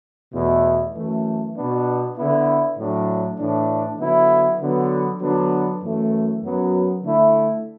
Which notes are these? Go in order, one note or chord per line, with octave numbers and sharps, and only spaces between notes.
E2 B2 A3 E4
F#2 E3 A3
B2 B3 D4
D3 B3 E4
A2 F#3 D4
A2 E3 D4
D3 F#3 B3 E4
D3 F#3 B3
D3 F#3 B3 D4
F#2 E3 A3
F#2 F#3 B3
D3 A3 E4